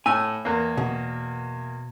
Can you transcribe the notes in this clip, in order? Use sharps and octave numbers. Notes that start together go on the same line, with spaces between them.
A2 G#5 E6
E2 A#3
B2